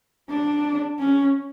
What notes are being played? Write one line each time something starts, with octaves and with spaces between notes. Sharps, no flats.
D4
C#4